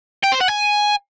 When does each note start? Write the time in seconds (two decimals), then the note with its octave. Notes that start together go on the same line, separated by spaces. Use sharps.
0.24 G5
0.32 C5
0.41 F#5
0.49 G#5